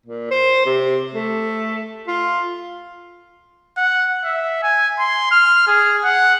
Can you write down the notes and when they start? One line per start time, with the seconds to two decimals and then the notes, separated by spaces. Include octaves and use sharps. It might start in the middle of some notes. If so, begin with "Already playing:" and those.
0.06 A#2
0.31 C5
0.66 C3
1.14 A3
2.08 F4
3.77 F#5
4.24 E5
4.63 G#5
4.99 C6
5.31 F6
5.67 G#4
6.04 F#5